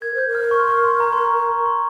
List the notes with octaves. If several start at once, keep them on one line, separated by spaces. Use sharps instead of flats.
A#4 G#6
C5 G6
A#4
F6
C#6
C6
C#6
C6
A#5
C6
C#6
C6
A#5
C#6
C6